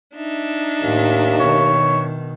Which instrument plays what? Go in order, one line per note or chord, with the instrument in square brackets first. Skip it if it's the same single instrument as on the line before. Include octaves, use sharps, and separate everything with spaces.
[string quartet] D4 D#4 E5
[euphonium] D#2 [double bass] A2
[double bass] B2 D#3 [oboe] C#5